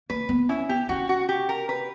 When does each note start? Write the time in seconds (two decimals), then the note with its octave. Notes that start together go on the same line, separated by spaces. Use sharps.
0.10 A#3 B4
0.29 B3
0.49 C#4 E4
0.69 B3 G4
0.89 C#4 F#4
1.09 F#4
1.29 G4
1.49 A#4
1.69 B4